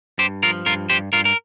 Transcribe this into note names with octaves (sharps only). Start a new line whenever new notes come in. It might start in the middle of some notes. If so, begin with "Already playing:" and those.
G2 G4 C5
F3 F4 A#4
G2 F4 A#4
G2 G4 C5
G2 F4 A#4
A#4